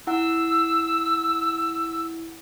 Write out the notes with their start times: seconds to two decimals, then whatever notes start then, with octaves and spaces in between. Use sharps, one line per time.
0.07 E4 F#5 E6